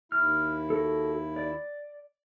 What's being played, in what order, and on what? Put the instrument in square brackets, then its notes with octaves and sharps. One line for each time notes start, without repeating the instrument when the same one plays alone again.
[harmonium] D#2 E4 [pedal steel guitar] F6
[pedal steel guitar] F#4 A4
D5